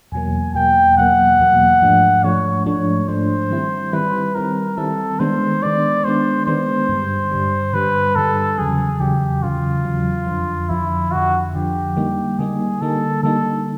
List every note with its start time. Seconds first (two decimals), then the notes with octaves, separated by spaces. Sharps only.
0.12 E2 B2 F#3 A#3 G#5
0.55 E2 B2 F#3 A#3 G5
0.97 E2 B2 F#3 A#3 F#5
1.40 E2 B2 F#3 A#3
1.82 G#2 F3 A3 D4
2.24 G#2 F3 A3 D4 C#5
2.66 G#2 F3 A3 D4 C#5
3.08 G#2 F3 A3 D4 C5
3.51 D#3 G3 C4 E4
3.93 D#3 G3 C4 E4 B4
4.35 D#3 G3 C4 E4 A#4
4.77 D#3 G3 C4 E4 A4
5.20 D#3 G#3 B3 D4 C5
5.62 D#3 G#3 B3 D4 D5
6.04 D#3 G#3 B3 D4 C5
6.46 D#3 G#3 B3 D4 C5
6.89 G2 D3 G3
7.31 G2 D3 G3
7.74 G2 D3 G3 B4
8.16 G2 D3 G3 A4
8.58 E2 C#3 F#3 G#4
9.00 E2 C#3 F#3 G4
9.43 E2 C#3 F#3 F4
9.85 E2 C#3 F#3
10.27 F2 D3 F3
10.69 F2 D3 F3 E4
11.12 F2 D3 F3 F#4
11.53 F2 D3 F3 G4
11.96 D3 G3 A#3 D#4
12.38 D3 G3 A#3 D#4 G#4
12.81 D3 G3 A#3 D#4 A4
13.23 D3 G3 A#3 D#4 A4